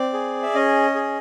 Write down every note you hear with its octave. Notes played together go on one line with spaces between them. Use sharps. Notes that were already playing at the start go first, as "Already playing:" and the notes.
Already playing: C4 D5
G#4
E5
C#4 D#5
G#4